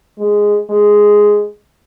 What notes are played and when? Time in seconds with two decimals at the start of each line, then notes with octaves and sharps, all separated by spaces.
0.18 G#3
0.70 G#3